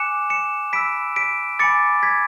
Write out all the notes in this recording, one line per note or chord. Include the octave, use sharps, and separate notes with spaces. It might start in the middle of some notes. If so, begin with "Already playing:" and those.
Already playing: G#5 D6 F#6 C#7 E7
C#7 E7
B5 E6 B6 D7
B6 D7
G#5 B5 D6 A6 C#7
G#6 B6